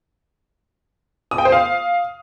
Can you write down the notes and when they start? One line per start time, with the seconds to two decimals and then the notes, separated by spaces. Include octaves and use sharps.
1.31 D#6
1.38 G5
1.45 C5
1.52 F5